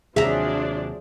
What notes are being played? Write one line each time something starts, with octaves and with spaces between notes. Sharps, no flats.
D#2 C3 F3 F#3 D4 G#4 E5 A#5